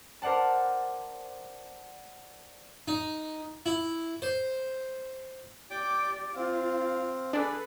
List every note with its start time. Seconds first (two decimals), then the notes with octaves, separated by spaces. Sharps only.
0.22 A#4 C5 D5 F#5 A5
2.88 D#4
3.66 E4
4.22 C5
5.71 G4 D5 G5 D6
6.36 C4 F4 F5
7.33 D4 G#4 A4 B4 D5